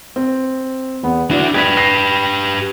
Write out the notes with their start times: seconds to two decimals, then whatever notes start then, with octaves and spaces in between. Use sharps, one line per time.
0.16 C4
1.03 E2 B3
1.31 D4 E4 F#4 D5
1.55 G4 B4 G#6 B6
1.77 A#6 C7